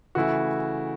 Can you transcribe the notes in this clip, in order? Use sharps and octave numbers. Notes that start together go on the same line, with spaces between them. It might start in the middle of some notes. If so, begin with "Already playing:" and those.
C#3 E3 A3 E4 F#4